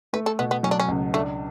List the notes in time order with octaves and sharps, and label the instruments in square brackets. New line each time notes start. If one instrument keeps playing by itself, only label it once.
[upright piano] A3 [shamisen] B4
[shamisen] A4
[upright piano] B2 [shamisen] B3
[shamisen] B3
[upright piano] F#3 [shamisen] C#4
[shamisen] D4
C#4
[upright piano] C#2
[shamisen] A3 [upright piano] D4